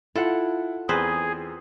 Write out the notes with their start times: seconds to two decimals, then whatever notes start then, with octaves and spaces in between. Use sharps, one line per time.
0.16 E4 F4 A4 F#5
0.89 E2 C4 G#4 B4 C5